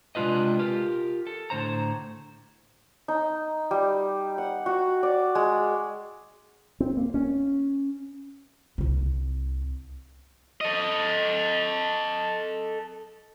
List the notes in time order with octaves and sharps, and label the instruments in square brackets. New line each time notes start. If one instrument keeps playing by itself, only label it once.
[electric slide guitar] C3 G#3 D4 F4 B4 D#5
F4 G4 A#4
A4
A2 D3 C5 A#5
[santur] D#4
G3
F#5
F#4
D5
G#3
[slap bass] C4
A#3
C#4
[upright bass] C2 C3
[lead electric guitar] A4 D#5